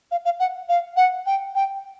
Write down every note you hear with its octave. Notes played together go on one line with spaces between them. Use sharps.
F5
F5
F#5
F5
F#5
G5
G5